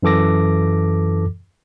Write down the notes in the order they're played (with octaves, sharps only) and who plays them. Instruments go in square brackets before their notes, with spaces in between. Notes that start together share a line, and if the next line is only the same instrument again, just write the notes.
[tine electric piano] F#2 E3 A4 D6 A#6